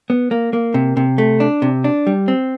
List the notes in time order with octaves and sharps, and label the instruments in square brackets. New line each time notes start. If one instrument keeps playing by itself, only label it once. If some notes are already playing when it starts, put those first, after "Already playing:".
[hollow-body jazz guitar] B3
A#3
A#3
C3
C3
A3
D4
C3
D4
G3
C4